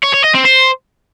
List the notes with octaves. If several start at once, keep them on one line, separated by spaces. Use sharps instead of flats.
C#5
C#5
D#5
C4
C5